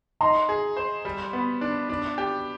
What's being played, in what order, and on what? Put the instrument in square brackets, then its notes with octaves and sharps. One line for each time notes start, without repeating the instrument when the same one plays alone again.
[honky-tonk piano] D#4 [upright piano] A#5 C6
[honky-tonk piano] G#4
C5
G3
B3
D4
D4
G4